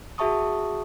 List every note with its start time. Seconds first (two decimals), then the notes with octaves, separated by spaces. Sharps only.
0.18 F#4 G#4 E5 A5 C#6 D#6